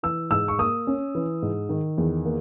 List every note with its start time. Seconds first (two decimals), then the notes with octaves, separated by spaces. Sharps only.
0.03 E3 E6
0.31 G#2 E6
0.48 C#6
0.59 A#3 D#6
0.87 C#4
1.15 E3
1.42 G#2
1.69 D#3
1.98 E2
2.25 A#3